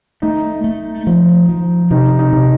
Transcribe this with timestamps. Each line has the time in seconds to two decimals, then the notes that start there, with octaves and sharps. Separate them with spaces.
0.22 A3 D#4
0.64 A3
1.07 F3
1.49 F3
1.91 C3 D#4
2.19 D#4
2.33 C3